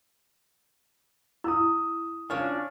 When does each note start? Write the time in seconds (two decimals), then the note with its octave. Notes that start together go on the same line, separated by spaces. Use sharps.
1.44 E4 D#6 E6
2.30 C#4 D4 F4 C#5 D5 F5 F6